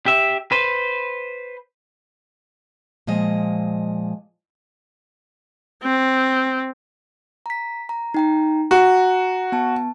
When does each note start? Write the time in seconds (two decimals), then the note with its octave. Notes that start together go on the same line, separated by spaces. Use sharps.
0.06 G4 E5
0.52 B4 C5
3.07 A#2 F3 G#3 D#5
5.83 C4
7.46 A#5 B6
7.89 A#5
8.14 D#4 G5 A#5
8.71 F#4 A#5
9.52 B3 A5